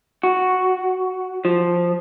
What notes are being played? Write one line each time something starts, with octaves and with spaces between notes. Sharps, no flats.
F#4
F3